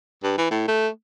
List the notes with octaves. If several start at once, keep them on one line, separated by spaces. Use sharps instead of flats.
G2
E3
A2
A3